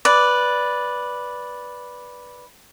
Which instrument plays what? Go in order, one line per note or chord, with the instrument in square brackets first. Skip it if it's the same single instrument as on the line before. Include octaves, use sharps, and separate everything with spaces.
[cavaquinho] B4 D5